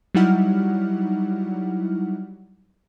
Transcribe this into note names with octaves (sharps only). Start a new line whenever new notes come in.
F#3 G3 D#4 E4 F#5 F6